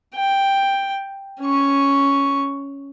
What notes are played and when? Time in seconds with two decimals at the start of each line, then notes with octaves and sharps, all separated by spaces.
0.15 G5
1.41 C#4 C#6